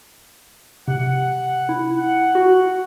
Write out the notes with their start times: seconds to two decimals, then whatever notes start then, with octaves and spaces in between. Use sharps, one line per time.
0.88 C3 F#5
1.69 E4
1.96 F#5
2.35 F#4